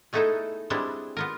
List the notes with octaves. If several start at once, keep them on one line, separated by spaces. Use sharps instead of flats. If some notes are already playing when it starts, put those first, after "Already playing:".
G#3 A3 B3 D#4 E4 A4
G3 G#3 B3 C4 D4 E4
B3 F4 A#4